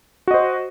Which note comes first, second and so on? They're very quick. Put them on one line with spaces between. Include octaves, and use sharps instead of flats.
F#4 D#5 C5